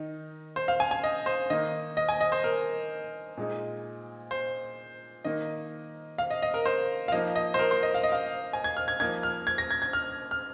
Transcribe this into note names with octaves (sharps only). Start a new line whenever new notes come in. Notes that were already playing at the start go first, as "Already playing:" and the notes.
Already playing: D#3 D#4
C5
F5
G#5
G#5
D#5
C5
D#3 A#3 D#4 D#5
D#5
G#5
D#5
C5
A#4
A#2 G#3 D#4
C5
D#3 A#3 D#4 D#5
F5
D#5
D#5
A#4
C5
F5
F3 A#3 D#4 D#5
D#5
C5
A#4
C5
D#5
F5
D#5
F5
G#5
G#6
F6
G#6
F3 A#3 D#4 G#6
F6
G#6
A#6
G#6
G#6
F6
F6